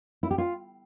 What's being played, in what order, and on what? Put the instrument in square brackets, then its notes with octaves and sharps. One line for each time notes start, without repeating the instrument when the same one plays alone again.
[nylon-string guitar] E4
G4
F4